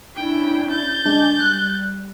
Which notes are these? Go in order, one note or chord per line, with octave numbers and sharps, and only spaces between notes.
C#4 D4 E4 G5
G6 A6
D3 G#3 D4
G3 F#6